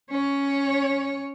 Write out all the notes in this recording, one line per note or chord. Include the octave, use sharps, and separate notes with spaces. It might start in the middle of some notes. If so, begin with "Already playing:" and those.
C#4 C#5